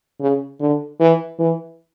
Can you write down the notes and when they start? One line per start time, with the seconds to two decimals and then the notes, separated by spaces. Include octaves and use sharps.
0.21 C#3
0.60 D3
1.00 E3
1.39 E3